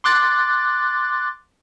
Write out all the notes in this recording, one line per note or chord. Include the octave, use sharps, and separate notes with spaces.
C6 D6 F#6 A6